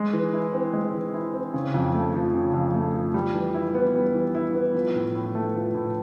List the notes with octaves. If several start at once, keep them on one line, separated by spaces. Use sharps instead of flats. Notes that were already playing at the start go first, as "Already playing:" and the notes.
Already playing: G#3
E3
E4
C4
G#3
E3
E4
C4
C#3
F2
A3
F3
C#3
F2
A3
F3
G3
E3
E4
B3
G3
E3
E4
B3
F3
A2
A2
A3
F3
A2